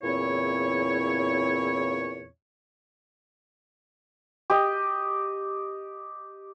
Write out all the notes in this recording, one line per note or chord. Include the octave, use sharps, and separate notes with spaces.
E2 A#2 C#3 C4 E4 C#5
G4 D#5